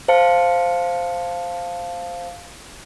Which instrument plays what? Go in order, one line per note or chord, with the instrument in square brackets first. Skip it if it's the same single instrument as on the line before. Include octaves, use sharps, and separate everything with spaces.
[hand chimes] C5 F5 A5 C#7